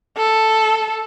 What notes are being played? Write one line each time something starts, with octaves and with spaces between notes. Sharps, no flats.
A4